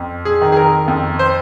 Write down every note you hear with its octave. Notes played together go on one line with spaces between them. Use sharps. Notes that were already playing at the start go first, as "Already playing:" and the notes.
Already playing: F2
G#4
D#3
G#4
A#4
F2
C5